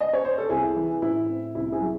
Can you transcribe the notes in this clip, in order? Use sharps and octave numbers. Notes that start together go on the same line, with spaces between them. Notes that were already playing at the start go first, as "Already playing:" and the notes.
D#5
C#5
C5
A4
C2 E4 G#4
E3
A2 E4
C4
C2 E4
E4 G#4
F#3